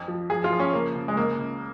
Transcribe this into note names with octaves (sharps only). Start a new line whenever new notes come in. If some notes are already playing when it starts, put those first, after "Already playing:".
Already playing: F2
F3
F3 G#4
F4
F3
C#4
C#3 A#3
C#3
G#3
C#2 A#3
C#3